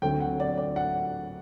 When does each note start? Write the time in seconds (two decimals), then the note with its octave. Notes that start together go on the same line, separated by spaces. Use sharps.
0.02 D2 D3 F#3 C4 G5
0.20 F#5
0.40 D5
0.58 D5
0.76 F#5